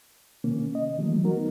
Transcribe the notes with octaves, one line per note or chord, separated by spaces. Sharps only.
C3 D#3 A#3 C#4
D#5
D#3 E3 F#3 G3 A3 A#3
B3 D#4 F#4 A#4